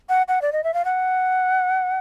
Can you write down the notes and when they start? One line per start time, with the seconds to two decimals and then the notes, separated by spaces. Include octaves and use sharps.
0.09 F#5
0.28 F#5
0.42 D5
0.53 D#5
0.64 E5
0.74 F5
0.85 F#5